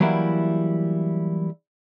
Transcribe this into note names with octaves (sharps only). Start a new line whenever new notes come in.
E3 F#3 G3 A#3 E4